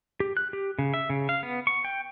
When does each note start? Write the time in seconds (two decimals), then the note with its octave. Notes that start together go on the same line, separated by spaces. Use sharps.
0.20 G4
0.37 F#6
0.53 G4
0.79 C#3
0.94 E5
1.10 C#3
1.29 F5
1.43 B3
1.67 C#6
1.85 G5